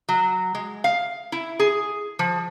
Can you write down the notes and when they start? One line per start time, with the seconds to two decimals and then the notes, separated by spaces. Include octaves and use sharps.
0.09 F#3
0.55 G#3
0.84 F5
1.32 E4
1.60 G#4
2.19 F3